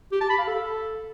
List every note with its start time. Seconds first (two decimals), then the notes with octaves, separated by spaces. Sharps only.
0.12 G4
0.21 A5
0.30 B5
0.38 F5
0.47 A4